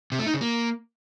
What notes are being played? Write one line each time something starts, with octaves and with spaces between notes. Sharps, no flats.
C3
A3
D#4
C#3
A#3